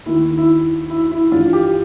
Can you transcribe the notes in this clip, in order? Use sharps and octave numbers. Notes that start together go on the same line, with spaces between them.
D#2 D#3 E4
E4
E4
E4
G2 E3 F4
G4